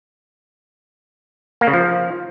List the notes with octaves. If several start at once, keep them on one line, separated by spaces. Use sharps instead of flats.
A#3
C#3
F3